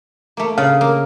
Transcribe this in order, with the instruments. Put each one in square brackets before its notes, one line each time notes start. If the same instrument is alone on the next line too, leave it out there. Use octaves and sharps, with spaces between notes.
[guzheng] A3 A#3
[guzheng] C#3 [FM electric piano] F5
[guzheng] A#3